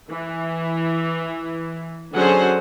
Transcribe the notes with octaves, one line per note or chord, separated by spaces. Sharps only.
E3
D3 F#3 C#4 G#4 C5 F#5